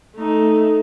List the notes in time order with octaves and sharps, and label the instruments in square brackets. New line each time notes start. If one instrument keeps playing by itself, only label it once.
[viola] A3 D#4